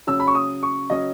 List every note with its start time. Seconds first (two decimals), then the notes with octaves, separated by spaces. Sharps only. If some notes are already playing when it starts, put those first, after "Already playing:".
0.07 C#3 F#3 C#4 E6
0.20 B5
0.27 C#6
0.35 D#6
0.63 C#6
0.90 C#3 F#3 C#4 D#5